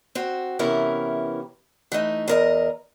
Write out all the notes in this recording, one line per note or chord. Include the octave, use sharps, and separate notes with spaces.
C4 F#4
C3 E3 B3 C#4 E4 A#4
E3 A3 D#4
E2 A#4 D#5